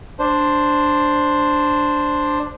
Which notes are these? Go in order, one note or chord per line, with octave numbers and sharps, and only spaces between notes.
D4 C5